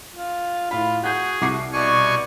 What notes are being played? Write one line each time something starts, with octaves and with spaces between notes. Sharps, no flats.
F4
A2 F4 B5
F#4 G#4 F#5 G6
C2 F#4 D6 C7
B2 D5 G#5 C#6